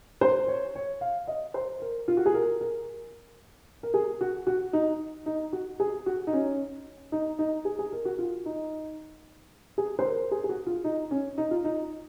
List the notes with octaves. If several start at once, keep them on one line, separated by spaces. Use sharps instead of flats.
C5
C#5
C#5
F5
D#5
C5
A#4
F4
F#4
G#4
A#4
A#4
A#4
G#4
F#4
F#4
D#4
D#4
F#4
G#4
F#4
D#4
C#4
D#4
D#4
G#4
G#4
A#4
F#4
F4
D#4
G#4
C5
A#4
G#4
G#4
F#4
F4
D#4
C#4
D#4
F4
D#4